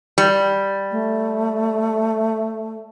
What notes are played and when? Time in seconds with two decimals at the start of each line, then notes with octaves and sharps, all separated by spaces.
0.18 G3
0.91 A3